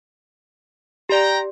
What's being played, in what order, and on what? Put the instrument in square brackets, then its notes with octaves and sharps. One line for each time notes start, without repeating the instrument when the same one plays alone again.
[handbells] G4 D5 [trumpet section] G5 A#5